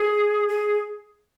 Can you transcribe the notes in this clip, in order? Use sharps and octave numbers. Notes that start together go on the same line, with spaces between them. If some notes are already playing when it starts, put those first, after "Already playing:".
Already playing: G#4
G#4